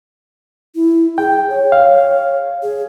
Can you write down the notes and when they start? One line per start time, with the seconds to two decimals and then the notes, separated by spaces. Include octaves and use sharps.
0.75 E4
1.18 G#4 G5
1.49 C#5
1.72 F5
2.63 G#4